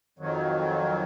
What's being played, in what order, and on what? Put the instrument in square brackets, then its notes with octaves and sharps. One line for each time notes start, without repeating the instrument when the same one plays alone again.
[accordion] F2 D#3 F#3